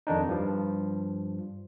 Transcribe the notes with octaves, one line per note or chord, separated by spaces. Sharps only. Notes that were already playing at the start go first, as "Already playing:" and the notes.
F2 D#3 D4 D#4
G2 F3